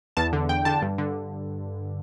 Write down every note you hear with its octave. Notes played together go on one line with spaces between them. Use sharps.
E2 A5
D3
E2 G5
D3 A5
G2
D3